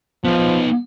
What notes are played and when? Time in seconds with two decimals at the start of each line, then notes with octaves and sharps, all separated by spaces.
0.24 F3 B3 D#4